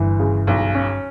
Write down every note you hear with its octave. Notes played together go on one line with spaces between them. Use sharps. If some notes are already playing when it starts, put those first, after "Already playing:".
Already playing: G1 D2 G2 E3
C#3
B1
C#4